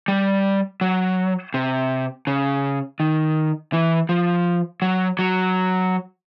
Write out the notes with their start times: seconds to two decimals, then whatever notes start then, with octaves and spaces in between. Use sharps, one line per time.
0.08 G3
0.81 F#3
1.54 C3
2.27 C#3
3.00 D#3
3.73 E3
4.09 F3
4.82 F#3
5.19 F#3